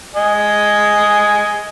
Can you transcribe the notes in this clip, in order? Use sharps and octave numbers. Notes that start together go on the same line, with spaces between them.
D#5 G#5